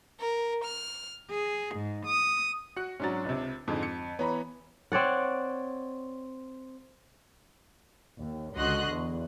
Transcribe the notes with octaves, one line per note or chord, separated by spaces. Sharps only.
A#4
F6
G#4
G#2
D#6
F#4 F#6 C#7
G#2 F#3 C#4 D4 A6
C#2 C3
F2 G#2 D3 G#3
C#7
E3 B3 C#5 A#5 B5
C4 C#5 D5 F#5
D#2
C#2 D3 F#4 D#5 C6 F#6
E2